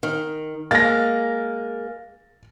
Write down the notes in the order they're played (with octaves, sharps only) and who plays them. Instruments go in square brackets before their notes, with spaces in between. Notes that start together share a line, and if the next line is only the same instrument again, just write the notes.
[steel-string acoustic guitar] D#3
[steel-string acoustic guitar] G#3 A#3 A#4 [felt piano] A6 A#6